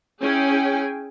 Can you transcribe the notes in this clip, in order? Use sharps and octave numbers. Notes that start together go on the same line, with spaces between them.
C#4 E4 G#4 G5 G#5